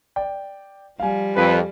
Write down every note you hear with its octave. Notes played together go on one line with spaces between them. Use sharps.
D5 G5
F3 G3 F5 G#5
F2 B4